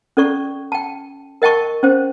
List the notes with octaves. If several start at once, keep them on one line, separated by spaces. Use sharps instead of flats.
C#4 A4 D5 C#6
G5 A5
A#4 D#5 G5 A5 C#6
C#4 C5